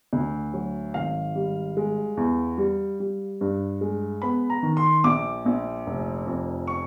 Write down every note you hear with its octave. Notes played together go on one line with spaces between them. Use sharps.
D2
F#3
G#1 F5
G3
G#3
E2
G3
G3
G2
G#3
B3 B5
A#5
D#3
C6
A#1 D6
A#1
F1
F2
C#6